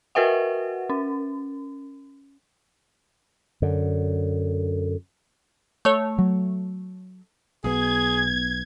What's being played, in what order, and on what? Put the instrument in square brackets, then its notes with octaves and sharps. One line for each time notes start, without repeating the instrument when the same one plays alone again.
[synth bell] F#4 A#4 B4 E5 F#5
C#4
[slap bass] F#2 D3
[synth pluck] A3 C#5
[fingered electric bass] F#3
[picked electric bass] B1 B3 [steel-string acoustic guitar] B2 [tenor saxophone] G#4 [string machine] G#6